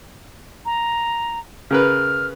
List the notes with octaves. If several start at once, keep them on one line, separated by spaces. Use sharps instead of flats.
A#5
C#3 A#4 B4 F6